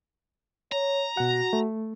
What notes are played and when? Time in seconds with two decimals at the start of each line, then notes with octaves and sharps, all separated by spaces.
0.72 C#5 A#5
1.17 B2 F#4 F#5
1.53 A3